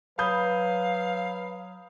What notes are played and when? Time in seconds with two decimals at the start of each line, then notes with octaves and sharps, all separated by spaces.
0.19 F#3 B4 F5 B5 D#6 G6